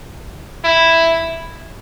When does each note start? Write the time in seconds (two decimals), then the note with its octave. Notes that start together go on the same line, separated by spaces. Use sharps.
0.65 E4